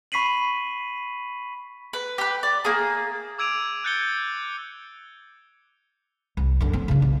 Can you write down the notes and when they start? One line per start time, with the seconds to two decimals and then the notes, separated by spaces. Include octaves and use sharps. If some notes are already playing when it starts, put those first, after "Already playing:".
0.12 B5 C#6 B6 C7 D#7 F#7
1.93 B4
2.18 G4 B4
2.43 D5
2.65 A#3 G#4
3.38 D6 E6 G#6 D7 D#7 F7
3.84 F#6 G6 A6 C#7 D7 G7
6.37 C2
6.61 F#2 D3
6.73 C4
6.88 C#3 D4
7.02 B1